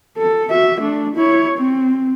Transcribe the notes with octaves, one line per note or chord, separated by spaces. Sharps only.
A4
F#4 E5
A3 D4
E4 C#5
C4